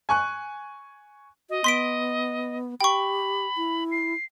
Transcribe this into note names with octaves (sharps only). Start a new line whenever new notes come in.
G#5 C#6 F#6
F#4 D#5
B3 C6 B6 D7
G4 G5 B5 C#6
E4
C7